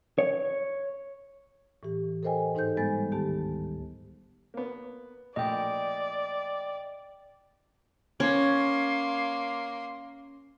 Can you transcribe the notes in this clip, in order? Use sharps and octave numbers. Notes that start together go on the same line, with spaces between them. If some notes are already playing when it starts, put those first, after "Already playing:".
C#5
A2 E3 G4
A4 A#4 C5 D#5 G5 G#5
G#2 D#4 A4 C5 G6
G3 G#3 B3 C5 G#5 A6
D2 D#3 B3 G4 A5
A#3 B3
A#1 A3 D5 D#5 G5
A#3 C#4 C6